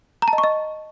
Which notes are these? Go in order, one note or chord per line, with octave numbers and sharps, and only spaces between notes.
A#5
A5
D#5
C#6
D#5